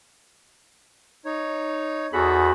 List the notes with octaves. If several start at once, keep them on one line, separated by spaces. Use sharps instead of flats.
D#4 C#5
E2 F#4 G#4 A4 B5